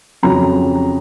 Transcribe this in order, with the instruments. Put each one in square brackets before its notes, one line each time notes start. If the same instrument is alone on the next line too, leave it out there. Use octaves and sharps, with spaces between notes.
[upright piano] F2 C#3 F#3 A#5